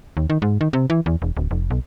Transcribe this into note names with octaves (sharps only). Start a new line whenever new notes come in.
D#2
D#3
G#2
D#3
C3
E3
E2
E1
D1
F1
B1